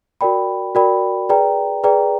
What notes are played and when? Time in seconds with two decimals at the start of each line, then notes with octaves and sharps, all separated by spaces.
0.21 F#4 A#4 D5 G5 B5
0.75 F#4 A#4 D5 G5 B5
1.29 G#4 B4 D5 G5 A#5
1.84 G#4 B4 D5 G5 A#5